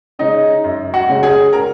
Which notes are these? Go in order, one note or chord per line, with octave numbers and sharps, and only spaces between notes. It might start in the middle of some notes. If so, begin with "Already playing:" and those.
C#3 G#3 C#4 D#4 D#5
F#2
F#4 F#5
C#3 G#3 C#4
G#4 G#5
A#4 A#5